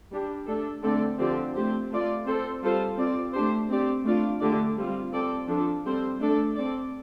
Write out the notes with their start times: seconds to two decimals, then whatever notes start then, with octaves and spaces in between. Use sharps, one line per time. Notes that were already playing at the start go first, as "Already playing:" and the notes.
0.11 G3 D4 G4
0.47 A3 D4 A4
0.82 D3 A3 C4 A4 D5
1.18 D3 F3 C4 G4 D5
1.54 A3 C4 G4 C5
1.90 A3 F4 D5
2.26 C4 A4 C5
2.62 G3 F4 A4 C5
2.97 C4 F4 D5
3.33 A3 D4 G4 C5
3.69 C4 G4 D5
4.04 A3 D4 F4 D5
4.40 D3 A3 D4 G4 D5
4.77 G3 C4 F4
5.12 C4 A4 D5
5.48 F3 D4 A4
5.84 G3 C4 A4 C5
6.20 A3 D4 A4 D5
6.55 C4 A4 D5